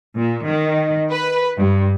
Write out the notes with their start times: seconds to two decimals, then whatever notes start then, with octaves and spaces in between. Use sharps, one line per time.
0.16 A#2
0.46 D#3
1.11 B4
1.57 G2